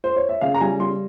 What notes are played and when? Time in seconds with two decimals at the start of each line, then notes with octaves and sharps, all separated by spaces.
0.04 C5
0.16 C#5
0.29 E5
0.41 C#3 F5
0.55 A#5
0.61 G3 G#5
0.80 G3 C6